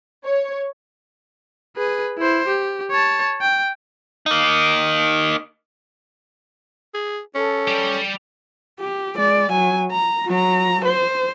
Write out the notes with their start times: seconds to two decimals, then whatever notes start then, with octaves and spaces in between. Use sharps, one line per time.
0.24 C#5
1.77 G#4 B4
2.18 E4 C5
2.47 G4
2.90 C#5 A5
3.41 G5
4.26 A#3 D#4
6.94 G#4
7.35 C#4 A4
7.68 G3 G4
8.80 G4
9.16 G#3 D5
9.51 F#3 G#5
9.91 A#5
10.27 F#3 A#5
10.85 C5